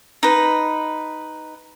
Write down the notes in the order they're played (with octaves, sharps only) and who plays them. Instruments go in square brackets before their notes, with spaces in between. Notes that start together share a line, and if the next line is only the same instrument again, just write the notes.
[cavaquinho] D#4 B4